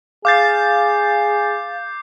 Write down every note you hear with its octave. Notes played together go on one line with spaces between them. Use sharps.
G#4 F5 D6 G6 A6 C7